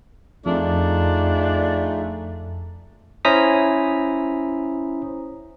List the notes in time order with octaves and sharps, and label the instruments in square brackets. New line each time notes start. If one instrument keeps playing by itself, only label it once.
[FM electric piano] F2 [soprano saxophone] A3 [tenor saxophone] D4 [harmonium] D#4 F4 G#4
[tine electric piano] C#4 E4 C5 A#5 D#6 B6